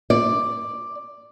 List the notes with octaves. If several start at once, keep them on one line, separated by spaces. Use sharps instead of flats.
D5